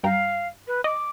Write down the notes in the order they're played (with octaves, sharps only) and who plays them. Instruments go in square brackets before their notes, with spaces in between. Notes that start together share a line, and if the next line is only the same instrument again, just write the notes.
[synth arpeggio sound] G2 G5 A#5 [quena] F5
[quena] B4
[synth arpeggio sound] D#5 [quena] D6